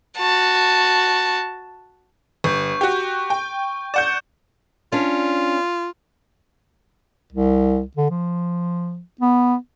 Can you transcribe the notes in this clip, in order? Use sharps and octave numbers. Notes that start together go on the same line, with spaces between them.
F#4 A5
G1 C#6 G6
F#4 G4
G5
D5 F#5 G6 E7
C#4 D4 F4
C2
D3
F3
B3